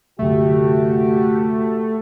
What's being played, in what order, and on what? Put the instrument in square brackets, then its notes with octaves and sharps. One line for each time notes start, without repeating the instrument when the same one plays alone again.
[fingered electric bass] C2 F#2 D3 [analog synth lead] A3 [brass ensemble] F#4 G4